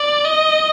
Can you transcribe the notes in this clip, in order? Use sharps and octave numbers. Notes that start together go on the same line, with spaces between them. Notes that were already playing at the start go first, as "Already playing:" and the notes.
Already playing: D5
D#5